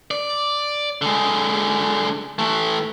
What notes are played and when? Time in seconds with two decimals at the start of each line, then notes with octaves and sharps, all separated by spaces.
0.11 D5
1.02 D3 G#3
2.39 E3 A3